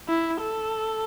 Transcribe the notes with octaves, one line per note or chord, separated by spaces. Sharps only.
E4
A4